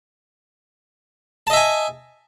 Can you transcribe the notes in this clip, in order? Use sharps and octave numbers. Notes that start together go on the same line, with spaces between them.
D#5 E5 G#5 A5